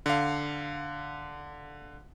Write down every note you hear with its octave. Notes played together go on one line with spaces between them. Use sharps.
D3 F5